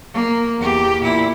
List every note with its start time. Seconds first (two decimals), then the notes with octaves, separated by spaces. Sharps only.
0.13 A#3
0.58 E2 G4
1.02 A#2 E4